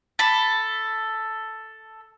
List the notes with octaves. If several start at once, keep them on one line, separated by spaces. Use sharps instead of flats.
A4 B5